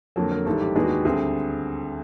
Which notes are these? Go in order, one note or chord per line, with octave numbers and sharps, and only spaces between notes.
F2 D3 F#3 A#3 A4
A#4
A1 G#2 D#3 G3 A4
G4
D#2 D#3 G#3 B3 D4 G#4
F#4
G4
D2 D3 G3 C4 G#4